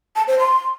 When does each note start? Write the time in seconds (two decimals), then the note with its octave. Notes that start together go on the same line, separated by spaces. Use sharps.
0.16 A5
0.28 C5
0.39 C6